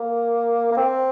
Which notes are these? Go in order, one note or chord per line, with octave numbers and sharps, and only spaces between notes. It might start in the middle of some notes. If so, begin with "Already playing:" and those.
Already playing: A#3
A#3
C4